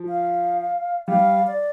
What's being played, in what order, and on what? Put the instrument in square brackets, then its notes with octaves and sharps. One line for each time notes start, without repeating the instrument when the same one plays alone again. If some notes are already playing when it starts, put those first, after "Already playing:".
Already playing: [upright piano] F3
[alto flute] F5
[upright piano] G3 [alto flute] F5
[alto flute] D5